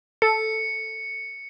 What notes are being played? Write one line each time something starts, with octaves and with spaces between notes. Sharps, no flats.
A4 C#7